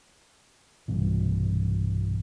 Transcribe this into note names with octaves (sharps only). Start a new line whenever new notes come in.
B1 G2 C3 E3